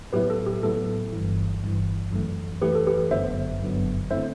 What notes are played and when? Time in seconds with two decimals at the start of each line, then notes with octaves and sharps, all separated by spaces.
0.13 A2 F#3 B3 E4 G4 B4
0.30 A4
0.46 G4
0.63 A2 F#3 B3 E4 A4
1.13 G1 G2 E3
1.62 G1 G2 E3
2.13 F#2 E3 A3
2.62 F#2 E3 A3 G4 B4
2.75 A4
2.87 G4 B4
3.11 G1 F#2 D3 F#3 B3 C5 E5
3.60 G1 F#2 D3 F#3 B3
4.11 D3 A3 C4 E4 C5 E5